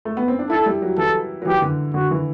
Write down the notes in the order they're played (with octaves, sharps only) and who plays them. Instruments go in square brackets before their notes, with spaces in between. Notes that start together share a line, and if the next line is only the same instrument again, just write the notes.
[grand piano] A3
B3
C4
D4
[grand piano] E4 [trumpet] A4
[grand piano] G3
F#3
[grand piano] E3 [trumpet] A4
[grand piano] F#3
[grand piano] E3 [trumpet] G4
[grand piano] D3
[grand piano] D3 [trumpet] F#4
[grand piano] E3